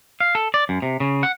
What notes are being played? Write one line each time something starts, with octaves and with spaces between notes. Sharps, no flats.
F5
A4
D5
F#2
C3
C#3
F#5